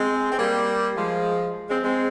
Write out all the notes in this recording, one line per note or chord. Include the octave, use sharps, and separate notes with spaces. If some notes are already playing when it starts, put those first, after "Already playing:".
Already playing: G#3 C4
C4
G3 A#3
F3 G#3
G#3 C4
G#3 C4